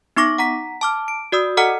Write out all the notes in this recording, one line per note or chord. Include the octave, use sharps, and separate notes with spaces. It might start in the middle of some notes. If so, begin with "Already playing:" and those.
B3 D#4 C#6 D6 A#6
F#5 A#5 B6
A5 D6 F6
D7
F#4 D5 D#6 E6
A4 D#5 F#5 A#5 F6 C#7